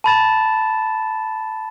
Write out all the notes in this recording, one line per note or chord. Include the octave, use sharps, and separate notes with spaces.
A5 B5 A6 E7